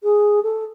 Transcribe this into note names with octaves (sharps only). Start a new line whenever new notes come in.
G#4
A4